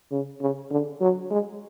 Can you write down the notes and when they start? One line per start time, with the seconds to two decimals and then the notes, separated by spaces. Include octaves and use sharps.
0.12 C#3
0.41 C#3
0.71 D3
1.01 F#3
1.31 G#3